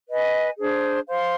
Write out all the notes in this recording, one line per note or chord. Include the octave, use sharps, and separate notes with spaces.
B4 D#5 G#5
D4 G#4 C5
C5 F5 C6